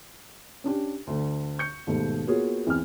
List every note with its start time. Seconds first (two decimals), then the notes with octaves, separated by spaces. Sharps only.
0.64 C#4 D4 G4
1.07 D2 D3
1.59 C#6 G6 C#7
1.87 D#2 G#2 B2 A3
2.27 A#3 B3 F4 F#4 G#4 C#5
2.67 E2 C4 F6